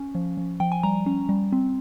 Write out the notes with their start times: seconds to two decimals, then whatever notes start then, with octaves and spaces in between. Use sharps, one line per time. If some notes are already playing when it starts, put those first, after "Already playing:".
Already playing: C#4
0.15 F3
0.37 F3
0.60 F3 G5
0.72 G#5
0.83 G3 A#5
1.06 C#4
1.29 G3
1.52 C4